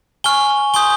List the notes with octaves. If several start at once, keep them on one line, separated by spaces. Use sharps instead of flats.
G#5 C#6 F6 G7
G#5 C6 D#6 G6 G7